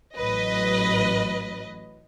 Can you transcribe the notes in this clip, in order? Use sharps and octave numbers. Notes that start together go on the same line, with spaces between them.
A1 F#3 B4 D#5